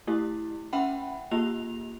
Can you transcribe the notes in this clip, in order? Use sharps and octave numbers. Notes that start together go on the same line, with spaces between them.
A3 E4 G4
C#4 E5 F#5 G5 B5
A#3 F4 G4 F7